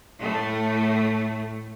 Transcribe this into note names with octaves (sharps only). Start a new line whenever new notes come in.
A2 A3